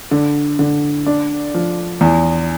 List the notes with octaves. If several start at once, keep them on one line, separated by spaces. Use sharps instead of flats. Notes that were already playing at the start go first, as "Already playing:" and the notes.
D3
D3
D4
F3
E2